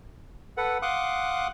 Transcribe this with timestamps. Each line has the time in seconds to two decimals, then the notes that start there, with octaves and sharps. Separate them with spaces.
0.57 A4 B4 F#5
0.82 F5 F#5 C6 D6 D#6 F#6